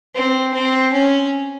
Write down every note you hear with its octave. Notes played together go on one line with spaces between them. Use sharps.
C4
C4
C#4